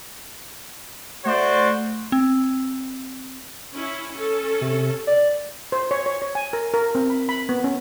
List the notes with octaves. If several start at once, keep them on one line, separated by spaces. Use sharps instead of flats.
A3 F#4 C5 D5
C4
C#4 E4
C#4 A4
C3
D5
C5
C#5
C#5
C#5
G#5
A#4
A#4
C4
B5
B5
B3
C#4